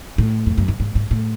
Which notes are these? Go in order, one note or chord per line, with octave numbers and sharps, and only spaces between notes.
A2
F2
F#2
G2
G#2
G#2
A2